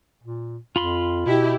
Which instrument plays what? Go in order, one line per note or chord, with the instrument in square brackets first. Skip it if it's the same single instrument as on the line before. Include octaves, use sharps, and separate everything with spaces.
[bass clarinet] A#2
[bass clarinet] F2 [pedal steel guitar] F4 B5 C6
[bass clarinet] B2 [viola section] E4 G4